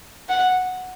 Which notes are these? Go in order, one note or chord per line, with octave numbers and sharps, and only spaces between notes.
F#5